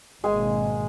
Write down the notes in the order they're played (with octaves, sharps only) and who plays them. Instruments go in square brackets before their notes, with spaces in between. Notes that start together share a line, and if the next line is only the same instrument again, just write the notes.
[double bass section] G#1 B2 A#3 [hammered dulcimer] G#3 [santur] G#4 G#5